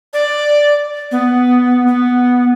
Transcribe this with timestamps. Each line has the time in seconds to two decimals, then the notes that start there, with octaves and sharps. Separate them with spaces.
0.13 D5
1.12 B3
1.87 B3